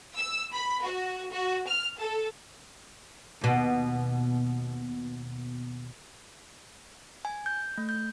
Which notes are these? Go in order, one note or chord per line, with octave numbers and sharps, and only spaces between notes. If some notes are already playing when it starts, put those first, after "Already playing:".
E6
B5
F#4
F#4
F6
A4
D#2 B2
G#5
G6
A3
G6